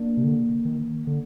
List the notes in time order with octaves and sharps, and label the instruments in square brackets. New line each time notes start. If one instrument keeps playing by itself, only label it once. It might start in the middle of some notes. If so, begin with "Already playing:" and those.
Already playing: [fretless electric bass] A#3 D4
[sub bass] C3
D3
D#3
D3